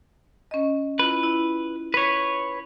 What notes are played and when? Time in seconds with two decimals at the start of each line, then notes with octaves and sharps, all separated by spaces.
0.51 C#4 D#5
0.99 E4 F4 B4
1.23 E4
1.94 B4 C#5